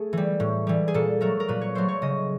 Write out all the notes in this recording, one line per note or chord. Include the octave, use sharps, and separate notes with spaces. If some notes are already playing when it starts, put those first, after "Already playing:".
Already playing: A3 G#4
E3 G3
A2
E3 G3
G#4
A#2 A4
F#3 A3 A#4
A#4
A#2 B4
C#5
F#3 A3 C5
C#5
C#3 D#5